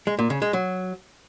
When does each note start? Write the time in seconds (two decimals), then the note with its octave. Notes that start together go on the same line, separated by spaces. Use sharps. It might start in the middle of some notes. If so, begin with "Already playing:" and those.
0.07 G#3
0.19 A#2
0.30 C#3
0.42 G#3
0.53 F#3